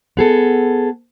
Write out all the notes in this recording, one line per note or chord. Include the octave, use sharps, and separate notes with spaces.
B3 G#4 A4